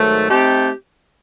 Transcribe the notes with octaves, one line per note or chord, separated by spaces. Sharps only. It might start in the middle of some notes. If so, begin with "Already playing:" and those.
Already playing: G#2 D#3 F#3 A3
A3 C4 D#4 G4